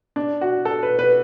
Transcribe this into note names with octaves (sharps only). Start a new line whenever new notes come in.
D4
F#4
A4
B4
B4